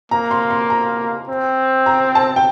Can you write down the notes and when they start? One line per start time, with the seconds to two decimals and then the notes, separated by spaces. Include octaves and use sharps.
0.11 A#3 A#5
0.31 C6
0.50 C6
0.70 A#5
1.29 C4
1.86 A#5
2.15 A5
2.36 G5